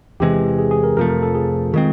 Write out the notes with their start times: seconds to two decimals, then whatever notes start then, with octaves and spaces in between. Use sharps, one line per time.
0.20 E2 C3 E3 G#3 G4
0.59 G#4
0.71 G#4
0.84 A#4
0.97 F2 C3 F3 A3 A#4
1.09 A#4
1.22 A4
1.35 G#4
1.73 D#3 G#3 C4 F4